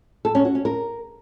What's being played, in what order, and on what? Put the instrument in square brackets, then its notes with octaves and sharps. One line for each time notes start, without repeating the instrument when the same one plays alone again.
[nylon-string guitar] A4
C#4
F#4
C#4
A#4